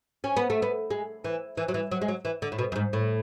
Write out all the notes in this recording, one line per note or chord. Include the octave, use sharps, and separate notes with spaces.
C#4
B3
A3
B3
G#3
E3
E3
F#3
E3
F#3
G#3
F#3
E3
D3
A2
B2
F#2
G#2
A2